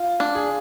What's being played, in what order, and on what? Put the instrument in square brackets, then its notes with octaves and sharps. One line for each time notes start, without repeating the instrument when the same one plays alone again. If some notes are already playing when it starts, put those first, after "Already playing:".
Already playing: [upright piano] F4
[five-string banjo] D4
[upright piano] G#4